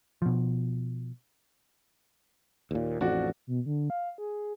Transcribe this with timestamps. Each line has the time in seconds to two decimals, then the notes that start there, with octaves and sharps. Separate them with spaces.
0.22 B2 F3
2.71 D#2 A#2
3.01 A1 F2 D4 F#4 D5
3.47 B2
3.66 D3
3.90 F5
4.18 G#4